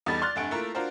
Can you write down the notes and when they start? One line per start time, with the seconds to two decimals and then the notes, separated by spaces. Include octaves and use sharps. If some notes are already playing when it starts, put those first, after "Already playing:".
0.06 E2 G3 D#4 A4 B5 A6
0.21 D5 C6 F6 F#6 A6
0.36 F1 G2 A3 F#5 G#5 D7
0.51 A3 A#3 E4 F4 A#4
0.75 D4 F4 F#4 A#4 C5